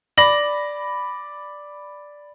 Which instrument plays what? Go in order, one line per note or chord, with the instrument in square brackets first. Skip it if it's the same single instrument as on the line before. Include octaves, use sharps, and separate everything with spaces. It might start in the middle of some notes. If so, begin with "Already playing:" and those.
[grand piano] D5 B5 A#6 F#7